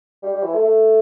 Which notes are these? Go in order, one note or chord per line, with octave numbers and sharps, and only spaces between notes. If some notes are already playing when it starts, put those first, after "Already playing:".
G3
G3
E3
A3
A3